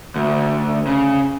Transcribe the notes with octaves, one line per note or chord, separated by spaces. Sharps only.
D2
C#3